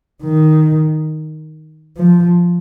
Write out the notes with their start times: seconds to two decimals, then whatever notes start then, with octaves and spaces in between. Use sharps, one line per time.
0.23 D#3
1.98 F3